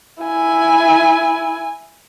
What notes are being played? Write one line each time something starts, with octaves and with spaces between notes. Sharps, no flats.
E4 G#5